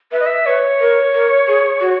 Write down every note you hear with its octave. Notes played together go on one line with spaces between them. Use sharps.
B4 E5
D#5
E5
B4 C#5
A#4
A#4
G#4
F#4